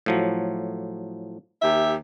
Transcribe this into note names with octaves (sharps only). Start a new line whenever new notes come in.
A2 F3 F#3
D#2 G4 E5